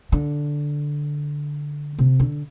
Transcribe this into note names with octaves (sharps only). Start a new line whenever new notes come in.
D3
C3
D3